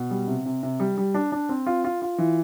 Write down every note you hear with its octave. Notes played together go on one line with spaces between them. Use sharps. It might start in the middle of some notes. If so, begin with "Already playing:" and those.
Already playing: B2
G3
C3
C3
C3
G3
G3
D4
D4
C4
F4
F4
F4
E3